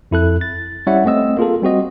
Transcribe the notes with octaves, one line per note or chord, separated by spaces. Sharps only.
F2 E4 A4 F#6
A6
G3 C#4 E4 C#5 E5 F#5
A3 C4 D#5 E6
A#3 F4 G#4 A4
G3 C4 F#4 D#5